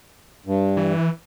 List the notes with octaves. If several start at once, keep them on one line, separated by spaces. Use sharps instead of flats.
G2
E3